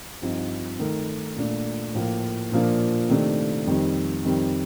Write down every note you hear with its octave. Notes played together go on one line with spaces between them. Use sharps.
G2 F3 C4 D#4
D#3 A3 D#4 A#4
A#2 A3 D4
A2 F3 A#3
A#2 F3 A#3 D4
C3 D#3 A3 D4
F2 D#3 G3
F2 D#3 G3